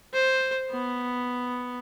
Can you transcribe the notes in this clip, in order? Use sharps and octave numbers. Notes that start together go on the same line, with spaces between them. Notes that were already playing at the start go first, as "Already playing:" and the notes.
C5
B3